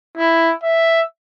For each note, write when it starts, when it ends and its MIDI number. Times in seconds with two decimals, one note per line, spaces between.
0.17 0.53 64
0.63 1.01 76